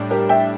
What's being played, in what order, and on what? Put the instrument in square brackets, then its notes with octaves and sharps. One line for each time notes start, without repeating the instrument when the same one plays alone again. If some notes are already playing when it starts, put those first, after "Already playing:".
Already playing: [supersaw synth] A2 G3 D4
[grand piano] G4 A#4
E5 G5